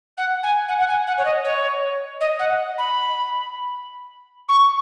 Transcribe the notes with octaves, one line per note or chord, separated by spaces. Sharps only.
F#5
G#5
F#5
F#5
G#5
F#5
C#5
D#5
C#5
D#5
F#5
B5
C#6